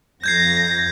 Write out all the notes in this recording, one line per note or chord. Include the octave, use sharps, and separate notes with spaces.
F2 G6 G#6 A#6 C7